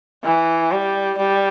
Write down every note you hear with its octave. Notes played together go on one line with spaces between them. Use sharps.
E3
G3
G3